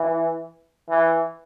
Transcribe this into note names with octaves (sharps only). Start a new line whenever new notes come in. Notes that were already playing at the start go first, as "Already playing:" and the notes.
Already playing: E3
E3